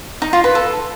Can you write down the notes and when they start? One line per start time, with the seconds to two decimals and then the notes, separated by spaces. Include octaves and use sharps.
0.22 D#4
0.33 F4
0.44 B4
0.55 A4